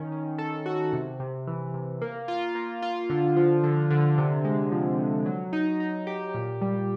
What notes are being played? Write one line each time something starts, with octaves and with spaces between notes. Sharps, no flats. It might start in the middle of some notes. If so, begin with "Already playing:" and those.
Already playing: D#3 C#4
C#4
A4
F#4
C3
C3
E3
C3
A#3
F4
A#3
F4
D3
F3
D3
D3
C3
G#3
F3
C3
F#3
D#4
D#4
G4
A#2
G3